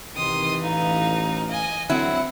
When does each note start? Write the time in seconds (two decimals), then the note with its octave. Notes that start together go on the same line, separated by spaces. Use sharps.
0.17 C3 D#3 E3 C6 D#6
0.63 A1 D#4 F5
1.51 D#5 G#5
1.90 D3 F#3 C4 E4 F#5